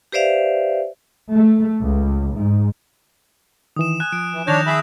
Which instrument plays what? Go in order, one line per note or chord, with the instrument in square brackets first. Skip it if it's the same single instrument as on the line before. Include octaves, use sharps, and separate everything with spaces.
[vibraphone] G4 B4 C5 D5 E5 F5
[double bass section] A3
C#2
G#2
[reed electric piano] D#3 E3 [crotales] D#6 E7
[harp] G#5 [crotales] F#6
[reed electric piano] F3 [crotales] D7
[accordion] E3
[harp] D#3 [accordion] D4 C#5 [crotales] G6 A#6 F7
[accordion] G#4 E5 B5 [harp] A5 C#6